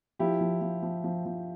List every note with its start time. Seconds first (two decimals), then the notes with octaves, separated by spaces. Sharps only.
0.19 F3 E4 G4
0.40 F3
0.61 F3
0.83 F3
1.04 F3
1.25 F3